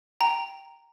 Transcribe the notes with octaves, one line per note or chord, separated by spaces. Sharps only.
G5 A#5